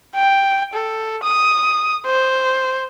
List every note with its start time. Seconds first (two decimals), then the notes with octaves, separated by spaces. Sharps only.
0.15 G5
0.74 A4
1.23 D#6
2.06 C5